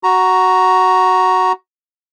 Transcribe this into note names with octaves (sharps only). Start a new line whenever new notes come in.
F#4 A#5